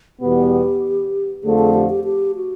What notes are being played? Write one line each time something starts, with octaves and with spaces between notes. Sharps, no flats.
E2 B2 G3 B3 G4
F2 D3 F3 A3 G#4
G#4
G4
G4
G4
F#4